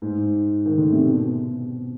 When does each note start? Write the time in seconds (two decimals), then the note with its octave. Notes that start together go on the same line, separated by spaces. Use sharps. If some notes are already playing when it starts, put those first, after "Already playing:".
0.02 G#2
0.66 D#3
0.78 D3
0.92 C3
1.05 B2